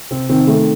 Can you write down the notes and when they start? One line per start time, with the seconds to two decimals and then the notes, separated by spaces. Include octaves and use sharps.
0.11 C3 C4
0.29 D#3 C4
0.47 D#3 A3